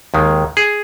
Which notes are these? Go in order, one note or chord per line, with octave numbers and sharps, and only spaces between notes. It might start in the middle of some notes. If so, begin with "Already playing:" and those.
D#2 D#3 G#3
G#4